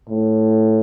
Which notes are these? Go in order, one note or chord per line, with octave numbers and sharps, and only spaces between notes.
A2